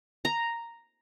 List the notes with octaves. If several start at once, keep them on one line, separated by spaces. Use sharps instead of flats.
A#5